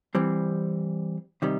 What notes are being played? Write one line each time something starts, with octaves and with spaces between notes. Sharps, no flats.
E3 G3 C4
C3 D#3 G3